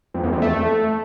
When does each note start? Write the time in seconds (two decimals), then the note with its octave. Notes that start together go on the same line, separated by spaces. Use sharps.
0.14 F2
0.24 E2
0.33 F2
0.42 A3